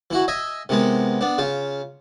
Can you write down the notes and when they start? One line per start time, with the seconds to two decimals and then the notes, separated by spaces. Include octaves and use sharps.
0.11 E3 E4 F#4
0.28 D#5 E5 G#5
0.69 C3 D#3 G#3 B3
1.21 B3 D4
1.38 C#3 F4